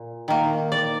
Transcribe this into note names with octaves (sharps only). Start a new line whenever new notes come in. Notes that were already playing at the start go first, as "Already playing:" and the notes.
Already playing: A#2
D#3 A#3
D5